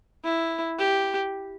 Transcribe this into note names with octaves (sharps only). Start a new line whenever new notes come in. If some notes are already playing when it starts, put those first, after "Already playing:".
E4
G4